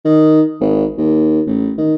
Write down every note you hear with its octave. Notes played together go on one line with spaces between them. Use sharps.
D#3
G#1
D#2
A1
D#3